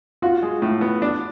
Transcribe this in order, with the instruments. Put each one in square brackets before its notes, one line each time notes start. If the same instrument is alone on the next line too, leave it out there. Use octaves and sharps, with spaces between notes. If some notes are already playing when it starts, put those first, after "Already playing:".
[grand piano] F4 [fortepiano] F#4
[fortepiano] G#3
A2
B3
D4